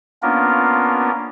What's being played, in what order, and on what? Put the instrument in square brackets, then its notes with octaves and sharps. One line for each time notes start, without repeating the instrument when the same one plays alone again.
[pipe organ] A#3 B3 C#4 D4 F4 A#4